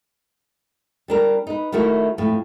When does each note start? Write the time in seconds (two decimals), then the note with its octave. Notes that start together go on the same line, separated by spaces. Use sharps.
1.08 G3 D4 A#4
1.47 D#4 B4
1.72 D#3 A3 E4 F#4 A#4
2.18 F2 A2